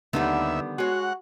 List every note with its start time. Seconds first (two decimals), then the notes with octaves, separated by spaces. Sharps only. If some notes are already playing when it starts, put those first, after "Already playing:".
0.13 D#2 D3 D#3 G3 B3 E5
0.78 G#3 F#4 C#5 F#5